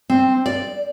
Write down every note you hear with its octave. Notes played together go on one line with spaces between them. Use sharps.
C4
D5